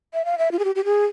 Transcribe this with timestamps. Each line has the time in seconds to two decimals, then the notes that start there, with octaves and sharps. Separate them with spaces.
0.14 E5
0.25 F5
0.38 E5
0.52 F4
0.59 G#4
0.65 G4
0.75 G4
0.85 G#4